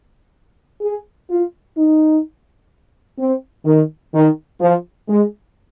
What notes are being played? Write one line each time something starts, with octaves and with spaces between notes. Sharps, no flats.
G#4
F4
D#4
C4
D#3
D#3
F3
G#3